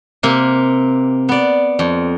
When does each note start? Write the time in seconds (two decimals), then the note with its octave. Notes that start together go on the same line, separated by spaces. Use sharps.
0.23 C3 A#3
1.29 B3 D5
1.79 F2